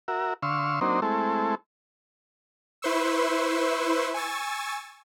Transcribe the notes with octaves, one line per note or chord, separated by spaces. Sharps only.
F#4 A#4 E5
D3 F5 C6 C#6 E6
F#3 A#3 C4 D4 D#4 C5
G#3 A3 C4 E4 A4
E4 B4 C5 C6 C#6 E6
G#5 C#6 E6 A6